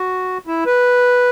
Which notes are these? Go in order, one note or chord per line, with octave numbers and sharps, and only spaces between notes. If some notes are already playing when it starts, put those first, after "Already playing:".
Already playing: F#4
E4
B4